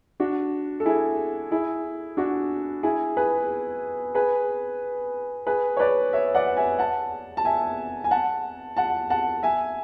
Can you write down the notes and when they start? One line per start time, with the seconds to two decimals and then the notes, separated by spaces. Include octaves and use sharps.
0.20 D4 F#4
0.80 A4
0.85 E4 G#4
1.52 E4 G#4
2.17 D4 F#4
2.83 E4 G#4
3.17 G#4 B4
4.15 G#4 B4
5.47 G#4 B4
5.77 C#5
5.80 B4 D5
6.13 C#5 E5
6.35 D5 F#5
6.57 E5 G#5
6.79 F#5 A5
7.37 A5
7.45 E5 G#5
8.04 G#5
8.11 F#5 A5
8.77 F#5 A5
9.10 F#5 A5
9.43 E5 G#5